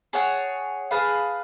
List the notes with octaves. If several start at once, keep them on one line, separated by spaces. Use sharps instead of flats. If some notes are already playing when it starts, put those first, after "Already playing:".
G#4 C#5 F#5 A5
G#4 B4 F5 A5